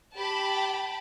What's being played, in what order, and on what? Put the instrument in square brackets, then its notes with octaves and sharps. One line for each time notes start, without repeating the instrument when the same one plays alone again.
[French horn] G4 [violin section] G5 A5 B5